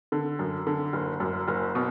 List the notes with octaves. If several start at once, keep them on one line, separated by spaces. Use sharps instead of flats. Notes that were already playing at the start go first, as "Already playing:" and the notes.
D3
F#2
D3
F#1
F#2
F#1
B2